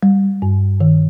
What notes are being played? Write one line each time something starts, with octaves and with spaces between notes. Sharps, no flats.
G3
G2
D#3